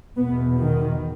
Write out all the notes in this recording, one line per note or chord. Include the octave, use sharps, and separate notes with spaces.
E2 B2 B3
D#3